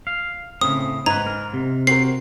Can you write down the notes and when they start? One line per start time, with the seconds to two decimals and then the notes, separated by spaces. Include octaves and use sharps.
0.07 F5
0.61 A2 C#3 C4 D#6
1.06 G#2 B4 G#5 A#5
1.27 A#4
1.54 C3
1.87 C4 F#4 A#4 C7